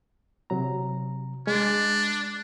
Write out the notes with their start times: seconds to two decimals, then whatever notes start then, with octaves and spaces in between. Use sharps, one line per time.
0.50 C3 F#3 A#5
1.47 G#3 D4